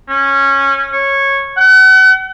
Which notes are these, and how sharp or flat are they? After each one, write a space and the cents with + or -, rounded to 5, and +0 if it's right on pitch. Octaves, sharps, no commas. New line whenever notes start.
C#4 -15
C#5 -10
F#5 +35